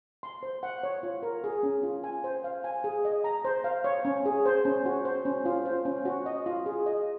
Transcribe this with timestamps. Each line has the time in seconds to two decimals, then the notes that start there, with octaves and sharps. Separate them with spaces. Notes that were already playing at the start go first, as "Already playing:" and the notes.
0.23 C6
0.43 C5
0.63 F#5
0.83 C#5
1.03 F4
1.23 A#4
1.44 G#4
1.63 C#4
1.83 F4
2.04 G#5
2.24 C5
2.44 F5
2.64 G#5
2.84 G#4
3.05 D#5
3.24 A#5
3.45 C5
3.64 F5
3.84 C#5
4.05 C#4
4.26 G#4
4.46 C5
4.65 C#4
4.86 F#4
5.05 C5
5.25 C#4
5.46 F4
5.65 C5
5.85 C#4
6.05 F#4
6.26 D#5
6.46 F4
6.66 G#4
6.86 D#5